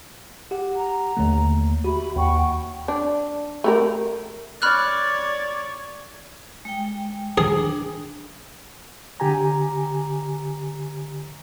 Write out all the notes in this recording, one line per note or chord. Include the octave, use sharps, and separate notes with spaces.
G4 F#5
A#5
D#2 D3 A3
F#4 G4 E5 B5
D#2 F#5 G5 C#6
D4
A3 G4 A#4
C#5 D5 B5 F6 F#6
G#3 G5
G#4
D4
D3 G4 G#5 A#5